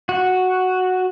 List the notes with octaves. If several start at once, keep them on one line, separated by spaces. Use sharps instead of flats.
F#4